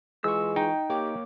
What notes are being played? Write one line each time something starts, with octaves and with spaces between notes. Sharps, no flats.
E3 G#3 F4 C#6 E6
D#4 G5
A#3 G4 C#5 D6